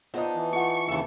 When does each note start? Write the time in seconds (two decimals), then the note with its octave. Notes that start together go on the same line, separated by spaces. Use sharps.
0.14 B3 D4 D#4 F4 C5 D#5
0.35 E3
0.53 F4 F#5 C#6
0.88 D#2 C#3 E3 E4 A4